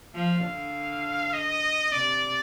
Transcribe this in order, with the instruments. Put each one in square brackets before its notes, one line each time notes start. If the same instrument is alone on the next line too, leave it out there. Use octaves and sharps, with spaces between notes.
[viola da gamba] F3 [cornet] F5
[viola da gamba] D3
[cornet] D#5
[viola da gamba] C3 [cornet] D5